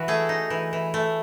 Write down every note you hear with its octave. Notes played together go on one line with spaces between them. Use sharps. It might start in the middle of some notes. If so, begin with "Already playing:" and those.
Already playing: E3 F#4
A3 G#4
D#4
E3
E3
A3